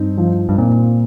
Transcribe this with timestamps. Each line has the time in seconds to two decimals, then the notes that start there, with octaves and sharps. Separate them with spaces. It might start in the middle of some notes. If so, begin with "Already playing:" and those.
Already playing: G2 C4 D#4
0.17 F3
0.49 G2
0.58 A#2 C4